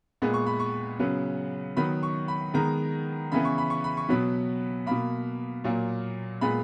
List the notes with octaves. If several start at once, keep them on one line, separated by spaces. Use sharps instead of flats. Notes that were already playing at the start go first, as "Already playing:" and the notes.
A#2 G#3 B3
C#6
B5
C#6
C#3 F#3 B3
D#3 F#3 B3 B5
C#6
B5
D#3 G#3 B3 A#5
C#3 E3 B3 B5
C#6
B5
C#6
B5
C#6
B2 F#3 B3 B5
B2 A#3 B5
A#2 F#3 A#3
A#2 G#3 B3 B5